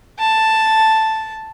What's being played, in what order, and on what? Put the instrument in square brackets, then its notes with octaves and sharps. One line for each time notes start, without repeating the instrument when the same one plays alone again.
[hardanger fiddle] A5